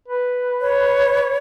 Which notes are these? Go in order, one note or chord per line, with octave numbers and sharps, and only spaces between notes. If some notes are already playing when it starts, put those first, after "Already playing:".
B4
C#5